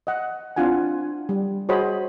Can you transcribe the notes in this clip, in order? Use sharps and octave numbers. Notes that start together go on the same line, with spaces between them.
D#5 F#5
C4 D4 E4 F4 F#5 G#5
G3
F#4 G#4 C5 C#5 D#5 B5